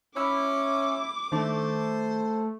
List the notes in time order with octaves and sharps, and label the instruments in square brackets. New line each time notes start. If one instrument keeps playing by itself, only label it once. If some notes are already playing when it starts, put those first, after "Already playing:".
[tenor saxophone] C#4 [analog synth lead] E4 [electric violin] D6
[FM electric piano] D#3 D4 [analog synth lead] A3 [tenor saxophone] C5